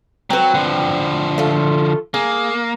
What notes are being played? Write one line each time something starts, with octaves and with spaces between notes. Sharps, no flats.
F#3 C4 B4
D3 F3
A3 F4
A#3 G#4